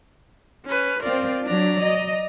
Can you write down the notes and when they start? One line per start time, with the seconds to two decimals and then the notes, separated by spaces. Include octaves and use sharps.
0.66 C#4 B4
1.03 C4 F4 A#4 D5
1.44 F#3 D4 D5 A#5
1.81 D#5